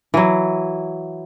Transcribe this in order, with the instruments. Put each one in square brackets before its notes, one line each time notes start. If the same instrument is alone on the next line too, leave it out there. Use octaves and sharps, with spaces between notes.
[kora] E3 F#3